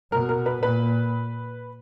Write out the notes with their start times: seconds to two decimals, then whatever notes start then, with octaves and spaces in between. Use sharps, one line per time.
0.12 B2 A#4
0.29 A#4
0.46 B4
0.63 A#2 B4